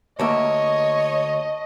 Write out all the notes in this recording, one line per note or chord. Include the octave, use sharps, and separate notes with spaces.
D2 A#3 C#5 D#5 E5 A5 C#6